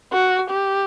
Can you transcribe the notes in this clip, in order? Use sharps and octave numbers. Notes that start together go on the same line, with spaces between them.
F#4
G4